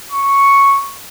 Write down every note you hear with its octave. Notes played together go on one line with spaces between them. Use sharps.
C#6